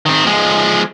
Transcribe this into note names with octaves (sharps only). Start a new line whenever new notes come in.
D#3 C4
F3 G#3